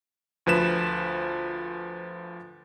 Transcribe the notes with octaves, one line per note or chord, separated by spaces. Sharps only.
D2 F3 B4 E7